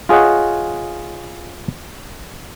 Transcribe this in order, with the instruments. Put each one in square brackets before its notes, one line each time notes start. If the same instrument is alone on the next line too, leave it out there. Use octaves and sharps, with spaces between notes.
[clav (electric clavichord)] F4 G#4 C#5 D#5 F#5